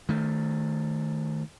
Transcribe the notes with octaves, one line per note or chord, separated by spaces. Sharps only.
D#3 A3